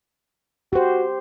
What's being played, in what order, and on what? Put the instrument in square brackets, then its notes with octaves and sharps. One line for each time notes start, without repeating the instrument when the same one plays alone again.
[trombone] F#4 [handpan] G4 C5